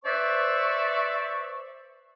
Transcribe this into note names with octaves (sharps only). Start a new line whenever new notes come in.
B4 C5 D5 E5 C#6